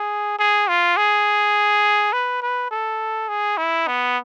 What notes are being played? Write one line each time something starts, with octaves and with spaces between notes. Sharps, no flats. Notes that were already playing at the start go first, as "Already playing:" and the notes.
Already playing: G#4
G#4
F4
G#4
B4
B4
A4
G#4
E4
B3